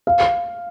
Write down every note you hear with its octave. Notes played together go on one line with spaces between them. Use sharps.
F5